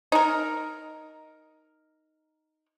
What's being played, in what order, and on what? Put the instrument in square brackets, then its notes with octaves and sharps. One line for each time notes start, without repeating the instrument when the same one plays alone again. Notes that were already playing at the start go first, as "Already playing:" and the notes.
[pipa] D#4 A#4